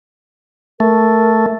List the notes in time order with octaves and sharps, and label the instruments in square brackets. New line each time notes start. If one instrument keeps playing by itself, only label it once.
[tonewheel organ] A3 [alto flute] A#4